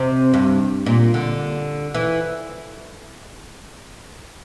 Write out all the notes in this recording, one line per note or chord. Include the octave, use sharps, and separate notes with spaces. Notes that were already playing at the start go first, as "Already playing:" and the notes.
Already playing: C3
G2
A#2
D3
E3